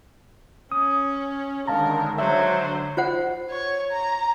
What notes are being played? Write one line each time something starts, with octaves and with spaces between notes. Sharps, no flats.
C#4 D#6
D3 D#3 G#3 A#4 F5 A5 A#5
D3 F#3 C5 E5
F4 C5 F#5
C#5
A#5